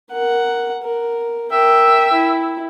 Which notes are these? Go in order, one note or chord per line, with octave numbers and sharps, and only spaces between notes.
A#4 F#5
A#4
A#4 E5 G5
E4